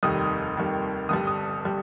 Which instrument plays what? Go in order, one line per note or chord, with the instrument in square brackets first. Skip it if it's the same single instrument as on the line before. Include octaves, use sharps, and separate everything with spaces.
[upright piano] F1 D#2 D#3 G3 D#6
F1 D#2 D#3 G3
G1 G2 G3 D#6
D#6
G3